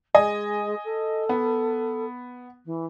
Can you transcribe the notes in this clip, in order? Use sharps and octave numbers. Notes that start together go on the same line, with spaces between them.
G#3 D#5 G#5
A4
B3
E3